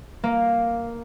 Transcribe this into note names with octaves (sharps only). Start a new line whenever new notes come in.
A#3